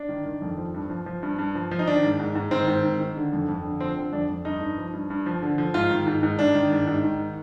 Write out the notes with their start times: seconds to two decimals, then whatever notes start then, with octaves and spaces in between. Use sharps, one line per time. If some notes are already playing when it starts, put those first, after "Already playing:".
Already playing: D4
0.09 D#3
0.26 D#3
0.42 F2
0.58 F3
0.74 G2
0.90 F3
1.06 F3
1.23 G2
1.39 G2
1.55 F3
1.71 F3
1.79 D#4
1.87 D#3 D4
2.03 G#2
2.20 G#2
2.35 G#2
2.51 D#3 C4
2.68 G#2
2.84 D#3
3.00 D#3
3.17 D3
3.33 F2
3.48 F2
3.64 D3
3.80 F3 C4
3.97 D3
4.13 F2 D4
4.29 F2
4.45 G2 D#4
4.61 G2
4.78 F3
4.93 G2
5.10 G2
5.26 F3
5.42 D3
5.58 F3
5.74 G#2 F4
5.91 D#3
6.07 G#2
6.23 G#2
6.39 G#2 D4
6.55 D#3
6.72 G#2
6.87 G#2
7.04 D#3